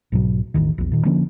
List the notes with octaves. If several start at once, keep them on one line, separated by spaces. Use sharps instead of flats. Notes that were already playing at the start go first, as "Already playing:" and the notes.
B1 G#2 B2 F#3
E1 A1 E2 D#3
A#1 E2
A#2 D#3
D3 F3 A#3 C#4